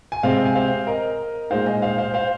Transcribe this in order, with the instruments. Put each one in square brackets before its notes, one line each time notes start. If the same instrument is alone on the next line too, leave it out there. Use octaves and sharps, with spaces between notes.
[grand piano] G#5
C3 G#3 C4 C5 F5
G#5
C5 F5
A#4 D#5
A#2 G#3 D#4 C5 F5
D#5 G#5
C5 F5
C5 F5
C5 F5